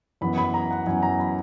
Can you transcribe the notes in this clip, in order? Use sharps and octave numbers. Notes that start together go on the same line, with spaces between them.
F#2 E3 B3 B5
B5
A#5
F#5
F#2 E3 B3 G#5
A#5
B5